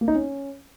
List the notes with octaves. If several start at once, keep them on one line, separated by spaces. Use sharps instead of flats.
A#3
D#4
C#4